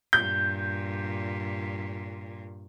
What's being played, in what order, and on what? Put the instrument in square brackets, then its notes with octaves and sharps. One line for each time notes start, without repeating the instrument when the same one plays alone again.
[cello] G2 A#2 [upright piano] G6